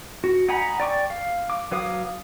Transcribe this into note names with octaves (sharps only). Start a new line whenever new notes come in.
F#4
D#4 F#5 G#5 A#5 B5
D5 G5 C#6 D6
F5
D6
F#3 B4 F5 D6 D#6